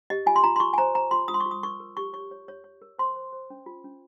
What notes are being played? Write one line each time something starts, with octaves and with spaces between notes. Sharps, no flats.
G4 D#5
F4 G#5
C6
F4 A#5
C6
F4 C#6
G#5
C5 A#5
C5 A#5
F4 C6
F4 D#6
C6
C#6
F4
D#6
A#4 C#6
A#4
G4 C#6
C#5 C#6
C#5
C#5
C#5
A#4
C5 C6
C5
C5
C#4
F4
C#4